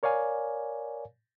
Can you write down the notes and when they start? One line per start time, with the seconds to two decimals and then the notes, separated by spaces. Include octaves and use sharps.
0.03 A#4 C#5 D5 F5 G#5